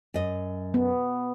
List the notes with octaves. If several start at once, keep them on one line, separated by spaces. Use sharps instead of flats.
F#2 D#5
B3